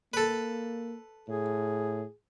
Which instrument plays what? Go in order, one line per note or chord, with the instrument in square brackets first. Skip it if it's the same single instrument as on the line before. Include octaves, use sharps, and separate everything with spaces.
[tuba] A#3 [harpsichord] A4 B4
[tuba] A2 [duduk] G#4